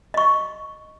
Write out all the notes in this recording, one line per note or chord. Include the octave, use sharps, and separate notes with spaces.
D#5 C#6